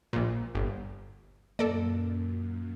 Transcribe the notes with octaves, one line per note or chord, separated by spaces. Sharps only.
A#1 A#2
G1
F#2 A#3 A4 D5